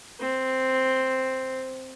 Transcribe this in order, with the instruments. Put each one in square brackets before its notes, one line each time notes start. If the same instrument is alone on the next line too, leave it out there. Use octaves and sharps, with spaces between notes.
[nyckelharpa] C4